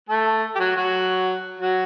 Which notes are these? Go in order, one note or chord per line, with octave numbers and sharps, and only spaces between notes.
A3 A4
G4
F#3 F#4
F#3 F#4
F#3 F#4